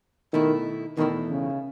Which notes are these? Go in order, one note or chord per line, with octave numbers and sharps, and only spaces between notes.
B2 D#3 A3 E4
E2 B2 D#3 A3 E4
C#3